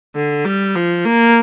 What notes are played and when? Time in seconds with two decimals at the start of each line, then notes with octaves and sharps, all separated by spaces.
0.15 D3
0.44 G3
0.75 F3
1.05 A#3